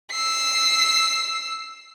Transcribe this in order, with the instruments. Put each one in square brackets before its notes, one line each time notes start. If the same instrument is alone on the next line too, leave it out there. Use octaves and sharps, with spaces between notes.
[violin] E6 C7